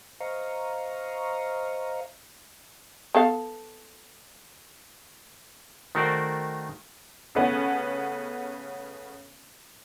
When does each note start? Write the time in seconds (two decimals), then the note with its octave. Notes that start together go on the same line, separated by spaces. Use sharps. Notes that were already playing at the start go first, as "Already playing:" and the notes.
0.20 C5 D#5 F5 A#5 C#6
3.15 B3 A4 F5
5.95 D#3 A3 F#4 A#4 C5 D5
7.35 C#3 A3 B3 C#4